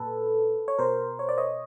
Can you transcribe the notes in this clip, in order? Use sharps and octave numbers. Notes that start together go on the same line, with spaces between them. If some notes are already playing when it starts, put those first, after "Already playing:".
Already playing: A#2 A4 B4
C#5
B2 A#4 C5
C#5
D5
C#5 D#5